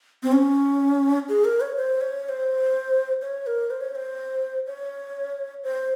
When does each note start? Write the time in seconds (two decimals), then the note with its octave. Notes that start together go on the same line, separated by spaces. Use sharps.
0.23 C4
0.32 C#4
1.29 G#4
1.45 A#4
1.61 C#5
1.77 C5
2.01 C#5
2.25 C#5
2.29 C5
3.22 C#5
3.47 A#4
3.70 C5
3.81 C#5
3.91 C#5
3.95 C5
4.67 C#5
5.64 C5